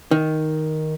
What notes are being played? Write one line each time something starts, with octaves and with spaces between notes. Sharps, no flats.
D#3